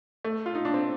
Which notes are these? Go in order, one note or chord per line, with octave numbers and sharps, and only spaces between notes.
A3
F4
D#4
D4
C4